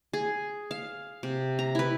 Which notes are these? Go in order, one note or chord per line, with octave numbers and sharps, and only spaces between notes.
G#4
F5
C3
A#5
E4 B4